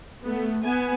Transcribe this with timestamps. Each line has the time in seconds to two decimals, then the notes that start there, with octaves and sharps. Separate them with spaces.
0.24 A3 B3
0.64 B3 G#5